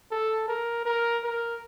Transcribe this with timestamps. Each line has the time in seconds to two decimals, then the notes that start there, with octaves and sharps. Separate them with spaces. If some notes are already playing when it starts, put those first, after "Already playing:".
0.11 A4
0.48 A#4
0.85 A#4
1.24 A#4